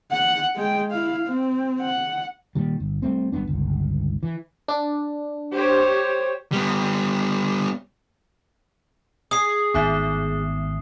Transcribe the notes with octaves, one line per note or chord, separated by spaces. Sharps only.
F#5
G#3 G5
E4 F5
C4
F#5
A#2 D#3 G3
G1
G3 A3 C4
G#1 G3 B3 D4
G1 C#2
E3
D4
G4 C5 C#5
G3 B3
G#4 D#6 C7
G#1 A2 B3 D#4 E5